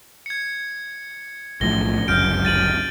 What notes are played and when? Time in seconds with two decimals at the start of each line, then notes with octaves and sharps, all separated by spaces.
0.26 G#6 C#7
1.61 B1 A2 F3 A#6 G7
2.08 G1 C#2 F#2 F6 G6 D7
2.45 A6 D#7 F#7